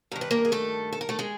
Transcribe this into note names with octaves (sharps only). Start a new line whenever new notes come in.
G2 D#3 A#4
B4
A#3 A#4
G#4
A3 A4
A4
A#4
A3 A4
G#3 G#4